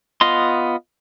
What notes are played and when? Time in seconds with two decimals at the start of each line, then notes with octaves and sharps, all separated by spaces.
0.21 B3 F4 D#5 C6